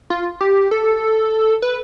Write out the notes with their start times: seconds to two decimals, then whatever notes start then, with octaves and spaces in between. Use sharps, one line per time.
0.10 F4
0.41 G4
0.71 A4
1.62 B4